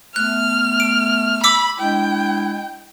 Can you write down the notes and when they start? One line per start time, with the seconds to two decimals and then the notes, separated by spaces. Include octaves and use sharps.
0.16 A3 B3 F6 F#6
0.80 D7
1.44 B5 D6 E6 B6
1.80 G#3 D4 E4 G5